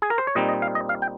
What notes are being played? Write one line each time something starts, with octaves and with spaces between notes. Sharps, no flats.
G#4
A#4
C5
C#5
A#2 G3 C4 D#4 D#5
D#5
F5
D#5
F5
G5